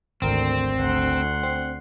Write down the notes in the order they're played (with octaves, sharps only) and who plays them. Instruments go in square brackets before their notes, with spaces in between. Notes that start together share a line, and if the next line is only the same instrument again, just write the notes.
[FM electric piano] G#1 A#4 [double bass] D2 [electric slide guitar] C4
[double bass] D2 [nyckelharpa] F#5 C6
[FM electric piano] C4 C7